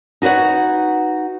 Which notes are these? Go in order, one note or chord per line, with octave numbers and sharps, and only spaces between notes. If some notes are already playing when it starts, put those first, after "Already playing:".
D#4 F#4 B4 C#5 F#5